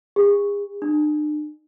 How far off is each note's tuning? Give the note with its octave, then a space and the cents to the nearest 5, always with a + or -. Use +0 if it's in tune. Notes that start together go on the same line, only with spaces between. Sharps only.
G#4 -40
D4 +45